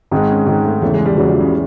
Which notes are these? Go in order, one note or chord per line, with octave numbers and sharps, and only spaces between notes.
G#2 D#3 G#3 C4
C#4
G#2 D#3 G#3 D#4
A3
E2 C#3 E3 A3
G#3
G3
E2 C#3 E3 F#3
F3
C#3